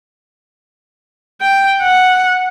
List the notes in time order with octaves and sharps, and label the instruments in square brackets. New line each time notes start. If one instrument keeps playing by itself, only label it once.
[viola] G5
F#5